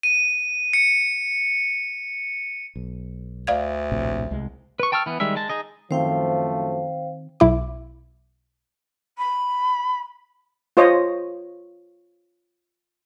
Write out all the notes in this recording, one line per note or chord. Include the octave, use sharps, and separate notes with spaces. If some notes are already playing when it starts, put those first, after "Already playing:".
D#7
C#7
B1
D2 D5 F5 G#6
A#1 A2 C3
C2 G#3
B4 C#6
G5 A5 C#6 E6 F6
E3 B3
D#3 G3 G#3 E5
G#3 A5
D#4 G#4 D#5
F#2 D#3 F3 A3 C4 C5 F5 G5
B1 E4 D6
B5
F4 C5 C#5 D#5